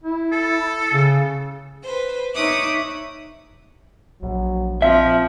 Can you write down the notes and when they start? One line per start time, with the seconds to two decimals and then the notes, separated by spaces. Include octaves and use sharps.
0.04 E4
0.32 A4
0.93 C#3
1.83 B4 C5
2.35 D#4 C#5 E5 D6 D#6 F#6
4.22 A#1 F#3
4.82 F3 C4 E5